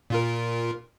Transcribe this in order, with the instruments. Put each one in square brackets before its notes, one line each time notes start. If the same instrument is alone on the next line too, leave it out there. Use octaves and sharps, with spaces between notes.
[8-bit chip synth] A#2 F4 A#4